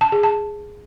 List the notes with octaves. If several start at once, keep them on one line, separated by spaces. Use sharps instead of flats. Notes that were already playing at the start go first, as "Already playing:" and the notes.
A5
G#4
A5